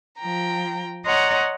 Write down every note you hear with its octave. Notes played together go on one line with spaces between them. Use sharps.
F3 G5 A#5
C#5 D#5 F#5 A#5 C6